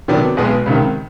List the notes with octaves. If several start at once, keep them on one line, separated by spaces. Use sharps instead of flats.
C3 D#3 F#3 B3 D4
B1 B2 G#3 B3
C#2 C3 D#3